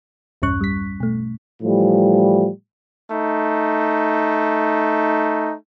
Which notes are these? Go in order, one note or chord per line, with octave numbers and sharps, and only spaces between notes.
B1 E2 G2 C#4 C#6 F#6
G3 B6
B2 A3
A2 E3 F3 G3
A3 D#4